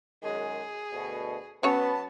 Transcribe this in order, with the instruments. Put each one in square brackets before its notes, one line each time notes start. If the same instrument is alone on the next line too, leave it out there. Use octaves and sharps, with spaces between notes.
[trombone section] F#2 D#3 G#3 [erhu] G#4
[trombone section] D2 B2
[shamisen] F#3 C#4 C#5 [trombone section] B3 [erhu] A5